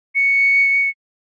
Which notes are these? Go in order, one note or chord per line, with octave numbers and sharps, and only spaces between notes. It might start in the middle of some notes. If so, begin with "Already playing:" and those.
C#7